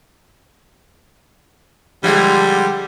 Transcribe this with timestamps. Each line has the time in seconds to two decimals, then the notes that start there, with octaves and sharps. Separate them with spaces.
2.03 D3 F3 G3 G#3